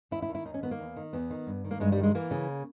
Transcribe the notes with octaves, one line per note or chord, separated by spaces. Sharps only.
D#2 E4
E4
D#3
E4
D#2 D#4
C#4
D#3 B3
A#3
E2
D#3
E2 B3
D#3
G2
D#3
A#3
G2 G#3
G3
D#3
G#3
E3 A#3
C#3